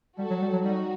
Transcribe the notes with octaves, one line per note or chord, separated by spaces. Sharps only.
G3 F#4 A4
F#3
G3
F#3
G3 D#4 F#4